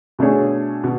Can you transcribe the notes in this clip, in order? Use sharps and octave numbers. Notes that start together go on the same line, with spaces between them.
B2 A3 D4 G#4 C#5
B2